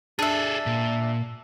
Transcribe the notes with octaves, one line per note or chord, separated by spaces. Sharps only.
D4 G#4 A4 E5
A#2